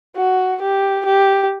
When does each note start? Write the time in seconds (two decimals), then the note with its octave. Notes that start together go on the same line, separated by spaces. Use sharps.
0.16 F#4
0.62 G4
1.06 G4